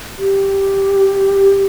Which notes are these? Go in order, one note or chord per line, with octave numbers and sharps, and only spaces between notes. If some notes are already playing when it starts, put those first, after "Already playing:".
G4